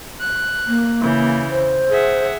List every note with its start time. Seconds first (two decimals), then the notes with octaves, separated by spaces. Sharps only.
0.19 F#6
0.67 A#3
1.01 C#3 E3 G6
1.50 C5
1.91 G#4 E5 F#5